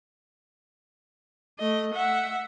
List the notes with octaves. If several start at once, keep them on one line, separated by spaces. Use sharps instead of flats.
A3 D#5
E5 F#5